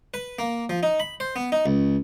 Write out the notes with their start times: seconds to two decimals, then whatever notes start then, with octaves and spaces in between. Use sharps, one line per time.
0.14 B4
0.39 A#3
0.70 F3
0.83 D#4
1.00 B5
1.20 C5
1.36 B3
1.52 D#4
1.66 C#2